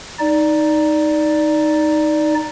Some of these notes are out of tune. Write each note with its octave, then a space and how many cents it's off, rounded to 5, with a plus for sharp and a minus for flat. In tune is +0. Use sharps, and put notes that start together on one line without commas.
D#4 +0 D5 +0